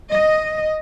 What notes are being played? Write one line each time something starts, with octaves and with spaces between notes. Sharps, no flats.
D#5